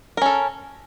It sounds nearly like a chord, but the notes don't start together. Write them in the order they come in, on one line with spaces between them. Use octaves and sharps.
A#4 C#4 A4